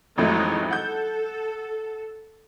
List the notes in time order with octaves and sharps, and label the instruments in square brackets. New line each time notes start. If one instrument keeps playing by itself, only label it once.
[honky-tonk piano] A1 F2 A3 [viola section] F#3 G#3 D#4
[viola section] A4 [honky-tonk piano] F#5 G6